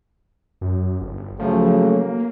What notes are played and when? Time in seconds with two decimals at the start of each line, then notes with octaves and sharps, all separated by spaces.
0.61 F#2
1.01 G1
1.39 C#3 F3 F#3 A3
1.80 A#3